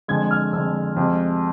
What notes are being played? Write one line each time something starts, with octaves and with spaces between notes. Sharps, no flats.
F2 D3 G#3 G#6
F6
F2 D3 G#3 E6
F2 C3 G#3